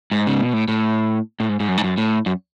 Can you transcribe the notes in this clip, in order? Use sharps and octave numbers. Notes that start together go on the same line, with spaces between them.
G#2
C#3
B2
A2
A2
A2
G#2
G#2
F#2
G#2
F#2
A2
F#2